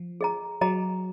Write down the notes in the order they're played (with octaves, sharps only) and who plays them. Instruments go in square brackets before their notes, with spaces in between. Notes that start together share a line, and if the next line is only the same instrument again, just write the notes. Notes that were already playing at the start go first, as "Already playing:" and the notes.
Already playing: [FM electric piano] F3
[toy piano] G#4 D#5 A#5
[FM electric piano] F#3 [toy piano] G#4 D#5 A#5